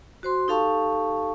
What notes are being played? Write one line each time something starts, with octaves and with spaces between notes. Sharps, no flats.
F#4 C5 C6
D#4 G4 A4 F5 A5 C#6